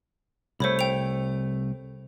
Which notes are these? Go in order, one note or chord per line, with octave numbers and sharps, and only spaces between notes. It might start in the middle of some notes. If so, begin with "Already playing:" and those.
C2 A3 C5 C#5 B5
G5 F7